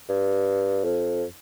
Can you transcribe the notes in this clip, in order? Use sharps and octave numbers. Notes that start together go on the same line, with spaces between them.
G2
F2